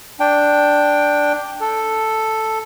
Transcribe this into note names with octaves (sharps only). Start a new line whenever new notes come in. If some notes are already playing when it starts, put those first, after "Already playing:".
D4 G5
A4